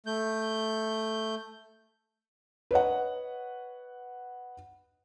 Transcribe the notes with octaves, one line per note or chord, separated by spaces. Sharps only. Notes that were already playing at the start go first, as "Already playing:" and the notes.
A3 G6
B4 C#5 D#5 F#5